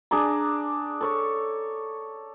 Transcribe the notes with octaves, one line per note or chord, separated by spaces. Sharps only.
D4 G#4 D5 A#5
A4 C#5 D5